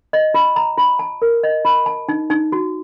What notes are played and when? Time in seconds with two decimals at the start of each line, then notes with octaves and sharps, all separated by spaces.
0.13 D#5
0.34 F4
0.56 A#5
0.78 F4
0.99 A5
1.22 A#4
1.43 D#5
1.65 F4
1.86 A5
2.08 D#4
2.30 D#4
2.52 F#4